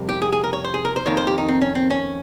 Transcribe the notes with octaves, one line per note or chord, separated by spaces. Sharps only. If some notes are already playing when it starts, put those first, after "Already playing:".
Already playing: F2 C3 G3 A#3
G4
G#4
G#4
A#4
C#5
C5
G#4
A#4
C5
F2 D#3 A#3 C#5
C5
G4
D#4
C4
C#4
C4
C#4